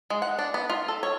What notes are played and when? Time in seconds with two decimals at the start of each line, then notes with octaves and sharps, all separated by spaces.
0.10 G#3
0.22 F#5
0.39 D4
0.54 B3
0.70 F4
0.88 A4
1.03 C#5